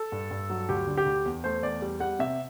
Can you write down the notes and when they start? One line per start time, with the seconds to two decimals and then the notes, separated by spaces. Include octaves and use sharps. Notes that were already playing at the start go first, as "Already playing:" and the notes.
Already playing: A4
0.12 G2
0.31 G2
0.50 F#3
0.69 D2 G4
0.87 D3
0.97 G4
1.06 D2
1.25 E2
1.44 A3 C5
1.62 E2 D5
1.82 G3
2.00 G3 F#5
2.19 C3 E5